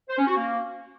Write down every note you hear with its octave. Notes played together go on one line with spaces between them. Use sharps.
C5
C#4
F#4
A#3